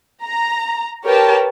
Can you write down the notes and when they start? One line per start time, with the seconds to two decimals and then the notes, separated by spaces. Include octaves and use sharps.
0.24 A#5
1.05 G4 A#4 B4 C#5 G5 A5